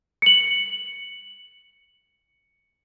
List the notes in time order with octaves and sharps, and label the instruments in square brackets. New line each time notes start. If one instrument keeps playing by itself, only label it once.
[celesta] C#7 F#7